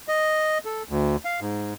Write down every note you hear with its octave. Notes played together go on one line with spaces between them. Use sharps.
D#5
A4
D2
F5
G#2